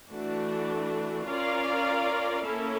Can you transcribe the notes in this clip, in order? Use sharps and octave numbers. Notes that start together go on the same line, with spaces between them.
E3 A3 D4 F#4
C#4 F4 A#4 D5 F5
A#3 C#4 E4 A4